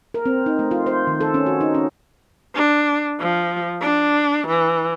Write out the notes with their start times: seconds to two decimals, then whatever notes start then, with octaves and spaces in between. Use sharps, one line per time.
0.14 A#4
0.26 C4
0.46 D#4
0.59 A3
0.71 F4
0.86 C5
1.07 D#3
1.21 A4
1.34 C#4
1.46 F#4
1.61 D#4
1.75 C#4
2.55 D4
3.20 F3
3.82 D4
4.47 E3